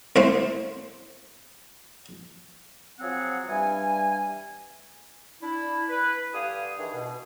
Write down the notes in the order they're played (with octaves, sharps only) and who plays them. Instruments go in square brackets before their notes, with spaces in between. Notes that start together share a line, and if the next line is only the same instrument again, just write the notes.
[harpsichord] C2 A3 E4 C5
[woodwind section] F3 F#3 C4 G#4 F#5
G2 E3 G3 G#5
D4 E4
B4
G2 D3 G4 F5 G#5 D#6
D#3 E3 D4 G#4
B2